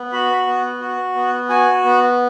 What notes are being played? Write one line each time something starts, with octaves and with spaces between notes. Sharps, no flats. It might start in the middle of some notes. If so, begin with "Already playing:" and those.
Already playing: B3
F#4 B5
B3
F#4
B3
F#4 G#5
B3